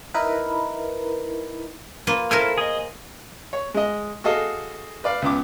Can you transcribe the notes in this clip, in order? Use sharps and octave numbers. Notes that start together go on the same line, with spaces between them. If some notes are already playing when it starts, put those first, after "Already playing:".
D#4 E4 A#4 B4
A#3 F4 B4
E4 A4 A#4 C5 G#5 F6
G#4 D#5
C#5
G#3 D#5
F#4 G#4 A4 D#5 F5
B4 D5 F5
C#2 B3 D6